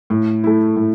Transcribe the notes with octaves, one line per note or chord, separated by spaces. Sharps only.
A2
A3 E4
A2